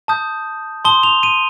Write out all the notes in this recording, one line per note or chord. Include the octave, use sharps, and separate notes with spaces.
A5 D#6 G6
A5 C6 D#6 G7
F7
D#7